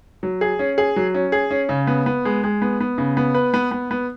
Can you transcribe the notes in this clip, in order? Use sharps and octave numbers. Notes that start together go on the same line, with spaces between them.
F#3
G#4
C#4
G#4
F#3
C#4
G#4
C#4
C#3
B3
B3
G#3
G#3
B3
B3
C#3
B3
B4
B3
B3
B3